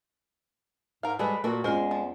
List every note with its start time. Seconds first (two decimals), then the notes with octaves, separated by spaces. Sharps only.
1.03 G#2 A#4 F5
1.19 F3 G3 G#3 G#4 A4 B4
1.44 A#2 A#3 F#4 A4
1.64 E2 G#3 C4 C#4 F4 C5
1.91 F3